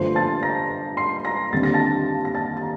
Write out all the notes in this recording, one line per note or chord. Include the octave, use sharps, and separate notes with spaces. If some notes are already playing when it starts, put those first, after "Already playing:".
Already playing: G1 G2 D3 F3 A3 C5 C6
A5 A6
A#5 A#6
C6 C7
A#5 A#6
D#2 D3 G3 C4 A6
A#6
A5 A6
A#6
A5 A6
A6
A#5